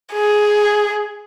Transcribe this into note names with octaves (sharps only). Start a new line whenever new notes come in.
G#4